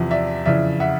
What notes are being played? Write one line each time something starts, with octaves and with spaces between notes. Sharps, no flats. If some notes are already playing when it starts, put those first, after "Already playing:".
Already playing: E2 C3 F3
D5 E5
F2 C#3 E3 D5 E5
E5 F#5